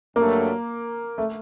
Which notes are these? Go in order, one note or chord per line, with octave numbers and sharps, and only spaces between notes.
G2 F#3 A3 A#3
A3